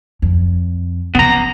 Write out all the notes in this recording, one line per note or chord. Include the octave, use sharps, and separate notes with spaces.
F2
C#3 F3 B3 A#5